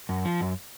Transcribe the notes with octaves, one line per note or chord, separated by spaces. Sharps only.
F#2
F3
F#2